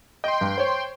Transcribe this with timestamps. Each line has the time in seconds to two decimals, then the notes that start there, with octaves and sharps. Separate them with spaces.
0.24 D#5 G5 C6
0.41 G2
0.58 C5 C#5